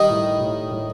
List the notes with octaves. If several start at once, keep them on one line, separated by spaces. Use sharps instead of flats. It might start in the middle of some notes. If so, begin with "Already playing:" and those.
Already playing: D#3 G3 D#4
A2
A2
A2